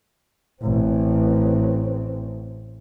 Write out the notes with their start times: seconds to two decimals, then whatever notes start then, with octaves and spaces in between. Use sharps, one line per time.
0.62 A1 C4